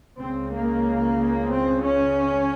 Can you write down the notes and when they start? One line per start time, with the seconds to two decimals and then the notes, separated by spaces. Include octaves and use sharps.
0.18 C#2 C#3 C4
0.52 A#3
1.50 C4
1.83 C#4